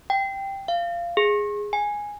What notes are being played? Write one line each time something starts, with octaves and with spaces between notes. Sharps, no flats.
G5
F5
G#4
G#5